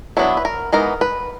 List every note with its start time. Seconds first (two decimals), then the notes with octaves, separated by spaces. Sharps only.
0.17 F#3 B3 D4 E4
0.37 B4
0.45 A#4
0.73 E3 G#3 B3 D#4 A#4
1.01 B4